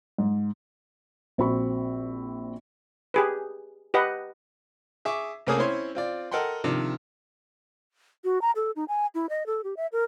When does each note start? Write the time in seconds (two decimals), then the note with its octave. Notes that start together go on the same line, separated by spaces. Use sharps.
0.18 G#2
1.38 A#1 C4 F#4 B5 C#6
3.14 G4 G#4 B4
3.94 G4 B4 D#5 F#5
5.05 G#4 E5 C#6 D6
5.47 C2 A3 A#3 C#4 G#4 D#6
5.59 C4 C#4 E4 C#5 C6
5.95 C4 F4 D5
6.31 A4 A#4 D#5 F#5 G5 C6
6.64 C3 D#3 F3 D4
8.24 F#4
8.42 A#5
8.56 A4
8.76 D#4
8.88 G#5
9.15 E4
9.30 D#5
9.46 A4
9.64 G4
9.77 E5
9.92 A#4